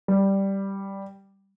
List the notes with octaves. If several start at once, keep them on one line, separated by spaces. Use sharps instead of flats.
G3